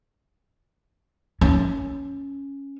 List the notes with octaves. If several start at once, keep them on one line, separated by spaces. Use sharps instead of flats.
C#4